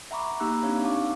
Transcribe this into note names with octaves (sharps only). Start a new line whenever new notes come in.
E5 F#5 A#5 B5 C#6 D6
A#3 D#4 G4 A#5 E6 F#6
C4 D4 D#4 G4 C#5 F5
F5 F#5 A5 C#6 D6